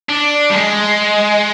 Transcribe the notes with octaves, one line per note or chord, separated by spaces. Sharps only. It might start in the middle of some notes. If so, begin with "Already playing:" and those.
D4
G3
G#3